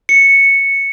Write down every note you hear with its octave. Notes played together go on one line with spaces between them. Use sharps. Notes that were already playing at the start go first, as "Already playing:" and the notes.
C#7